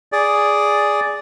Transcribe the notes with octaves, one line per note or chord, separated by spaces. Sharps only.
G#4 D5